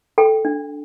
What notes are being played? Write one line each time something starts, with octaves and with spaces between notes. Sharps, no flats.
A4 G5
D4